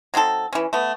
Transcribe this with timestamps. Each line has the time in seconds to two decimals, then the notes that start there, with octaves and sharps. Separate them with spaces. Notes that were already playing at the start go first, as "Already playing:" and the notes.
0.14 F#3 C4 D#4 A4
0.53 E3 C#4
0.73 A3 B3